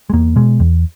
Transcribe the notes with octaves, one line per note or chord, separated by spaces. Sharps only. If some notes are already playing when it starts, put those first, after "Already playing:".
G#3
E2 A#3
B2 G#3
E2